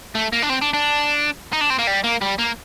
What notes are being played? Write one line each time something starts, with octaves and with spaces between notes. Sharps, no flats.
A3
A#3
D4
C4
D4
D4
D#4
D4
C4
A#3
G3
A#3
G3
A#3